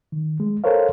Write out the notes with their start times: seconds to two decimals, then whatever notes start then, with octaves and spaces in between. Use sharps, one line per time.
0.12 D#3
0.40 G#3
0.64 A4 A#4 C5 C#5 F5